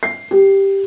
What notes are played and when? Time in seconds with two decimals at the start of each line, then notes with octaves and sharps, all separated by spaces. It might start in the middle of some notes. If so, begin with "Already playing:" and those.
0.03 C7
0.31 G4